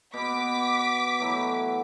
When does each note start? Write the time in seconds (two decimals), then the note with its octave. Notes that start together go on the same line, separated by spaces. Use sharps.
0.13 B2 B3 D6 B6
1.20 E3 F#3 A3